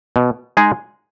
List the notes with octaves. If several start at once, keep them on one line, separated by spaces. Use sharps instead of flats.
B2
G#3 D#4 G#4